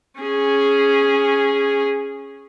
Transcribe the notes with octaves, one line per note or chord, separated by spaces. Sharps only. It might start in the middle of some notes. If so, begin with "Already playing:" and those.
C#4 G#4